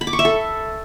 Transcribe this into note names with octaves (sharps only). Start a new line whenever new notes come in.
B5
D6
C#6
E5
A4